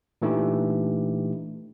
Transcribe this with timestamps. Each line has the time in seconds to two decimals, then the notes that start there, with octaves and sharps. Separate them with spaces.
0.22 A#2 E3 A3 D4 D#4 G4